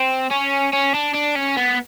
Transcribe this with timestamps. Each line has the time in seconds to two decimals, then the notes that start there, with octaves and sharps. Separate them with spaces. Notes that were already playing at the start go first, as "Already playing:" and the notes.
Already playing: C4
0.31 C#4
0.73 C#4
0.94 D4
1.14 D4
1.36 C#4
1.57 B3